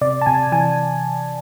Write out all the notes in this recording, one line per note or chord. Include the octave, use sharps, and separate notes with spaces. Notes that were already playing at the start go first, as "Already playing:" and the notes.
C3 D5
A5
C3 G#5
E3 G#5